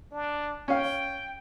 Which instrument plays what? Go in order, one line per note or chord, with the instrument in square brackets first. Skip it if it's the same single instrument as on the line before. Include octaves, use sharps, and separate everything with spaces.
[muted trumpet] D4
[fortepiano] C#4 F5 [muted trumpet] G5